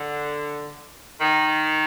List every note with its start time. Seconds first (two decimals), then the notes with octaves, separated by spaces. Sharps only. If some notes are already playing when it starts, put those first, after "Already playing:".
Already playing: D3
1.21 D#3